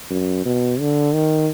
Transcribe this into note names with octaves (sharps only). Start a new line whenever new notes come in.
F#2
B2
D3
D#3